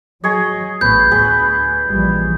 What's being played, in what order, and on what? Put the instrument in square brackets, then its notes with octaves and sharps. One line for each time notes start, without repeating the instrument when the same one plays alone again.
[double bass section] F#3 [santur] G#4 C#5 D#5
[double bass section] A1 A2 B3 [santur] B4 [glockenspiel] G6
[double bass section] D2 [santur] G#4 B4 G5
[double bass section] A#1 E3 G3